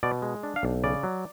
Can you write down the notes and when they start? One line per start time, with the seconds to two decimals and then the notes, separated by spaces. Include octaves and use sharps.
0.03 B2 D5
0.22 G#3
0.43 D4
0.56 F5
0.63 B1
0.84 C#3 D5
1.03 F#3